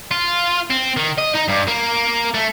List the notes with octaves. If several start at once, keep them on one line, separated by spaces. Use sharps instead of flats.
F4
C4
D#3
D#5
D#4
G2
A#3
A3